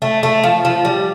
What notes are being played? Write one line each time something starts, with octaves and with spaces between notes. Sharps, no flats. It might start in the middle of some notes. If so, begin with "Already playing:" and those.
A3
A3
F3
F3
G3